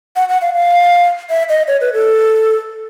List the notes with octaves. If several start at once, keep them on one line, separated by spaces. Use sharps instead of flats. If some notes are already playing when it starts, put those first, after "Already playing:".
F#5
F#5
F5
F5
E5
D#5
C#5
B4
A4